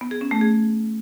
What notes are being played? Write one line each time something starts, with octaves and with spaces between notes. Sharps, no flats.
B3
G#4
C#4
A3
G#4